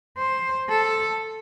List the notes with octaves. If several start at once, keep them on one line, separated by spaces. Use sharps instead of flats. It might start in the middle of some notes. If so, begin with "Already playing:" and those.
C5
A4